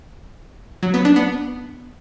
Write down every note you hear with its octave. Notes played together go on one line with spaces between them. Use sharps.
F#3
B3
D4
B3